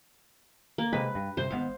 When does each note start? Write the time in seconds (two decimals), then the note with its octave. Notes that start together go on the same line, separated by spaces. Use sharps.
0.78 A#3
0.93 C3 G#3 B4
1.15 G2
1.37 G2 C3 C5
1.50 G#1 G#2 B3 F5